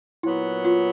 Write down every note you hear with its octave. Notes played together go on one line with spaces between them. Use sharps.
A#2 F#3 B3 E4
F4